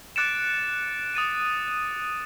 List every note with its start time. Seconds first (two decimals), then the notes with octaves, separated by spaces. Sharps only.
0.16 D6 F#6 A6 C#7 D7 E7
1.15 D#6 A6 D#7